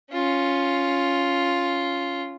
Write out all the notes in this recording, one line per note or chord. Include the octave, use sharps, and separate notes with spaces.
C#4 F4